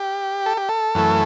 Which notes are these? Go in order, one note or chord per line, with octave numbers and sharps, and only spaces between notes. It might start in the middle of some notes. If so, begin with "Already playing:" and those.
Already playing: G4
A4
G4
A4
F#2 E3 A3